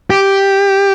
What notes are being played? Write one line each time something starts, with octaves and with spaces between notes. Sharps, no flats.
G4